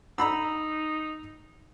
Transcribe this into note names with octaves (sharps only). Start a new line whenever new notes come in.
D#4 A#5 B5 E6